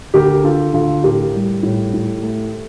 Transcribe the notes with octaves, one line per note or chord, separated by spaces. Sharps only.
D2 G4 A#4
D3 F4 A4
D2 F4 A4
A2 G4 A#4
G3
A2
A2
A3